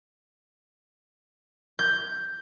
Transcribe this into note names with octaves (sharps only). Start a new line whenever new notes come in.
G6